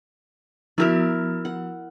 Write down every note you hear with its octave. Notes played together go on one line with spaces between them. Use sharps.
F3 B3 E4 F#4 A#4 E5
F#5